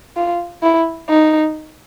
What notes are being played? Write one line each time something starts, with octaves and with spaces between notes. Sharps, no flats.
F4
E4
D#4